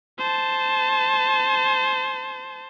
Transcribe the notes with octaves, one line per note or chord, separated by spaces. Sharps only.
C5 A5